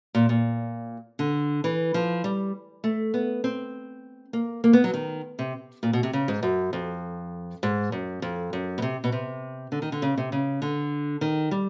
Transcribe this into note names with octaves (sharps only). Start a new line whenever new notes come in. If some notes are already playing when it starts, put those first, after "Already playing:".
A#2
A#2
D3
E3
F3
G3
A3
B3
C4
A#3
A#3
B3
F#3
D#3
C3
A#2
B2
C3
C#3
G#2
F#2
F2
G#2
F#2
F2
F#2
B2
C3
B2
C3
D3
D#3
D3
C#3
C3
C#3
D3
D#3
G3